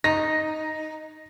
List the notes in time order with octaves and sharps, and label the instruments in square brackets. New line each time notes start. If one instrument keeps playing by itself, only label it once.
[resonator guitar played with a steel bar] D#4 [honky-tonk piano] A#6